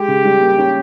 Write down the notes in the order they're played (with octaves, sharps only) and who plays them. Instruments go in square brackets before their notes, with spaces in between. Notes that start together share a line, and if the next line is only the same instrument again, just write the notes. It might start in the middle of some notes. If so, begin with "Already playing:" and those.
Already playing: [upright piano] G#3 [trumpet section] G4
[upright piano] C#3
G3
A#3
C#4